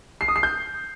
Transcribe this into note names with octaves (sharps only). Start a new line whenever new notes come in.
C7
D#6
C7
G6